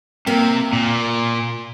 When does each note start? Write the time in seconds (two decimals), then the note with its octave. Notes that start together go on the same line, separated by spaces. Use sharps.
0.26 C3 A#3
0.73 A#2